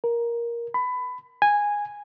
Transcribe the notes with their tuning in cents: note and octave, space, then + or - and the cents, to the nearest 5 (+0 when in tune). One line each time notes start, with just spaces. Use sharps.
A#4 +10
B5 +20
G#5 -10